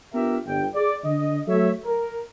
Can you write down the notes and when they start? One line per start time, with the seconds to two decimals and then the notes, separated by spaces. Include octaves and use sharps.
0.14 B3 D4 F4 G4 A#4 E5
0.46 G1 G5
0.75 G#4 D5
1.04 D3 D#5
1.47 F#3 A3 A4 C#5 E5
1.85 A#4